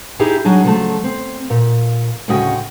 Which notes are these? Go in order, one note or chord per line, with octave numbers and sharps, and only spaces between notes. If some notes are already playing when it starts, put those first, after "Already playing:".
D#4 E4 G4 G#4 E5
F#3 D4 D#4 G#4
C#3 F3 F#3 A3 A5
C4
A#2
D2 A2 C#3 F#4 D#5 G5